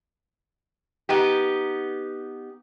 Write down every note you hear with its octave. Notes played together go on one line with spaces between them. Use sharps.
B3 D#4 G4